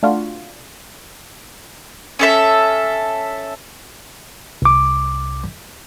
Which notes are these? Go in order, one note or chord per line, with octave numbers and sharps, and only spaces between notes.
A3 D4 F4 F#4
C#4 A4 E5
C2 D6